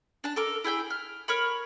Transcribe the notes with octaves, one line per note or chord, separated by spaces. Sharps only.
D4 A5
A4 A#4 D6
E4 G#4 G5 B5
F6
A#4 C#5 B5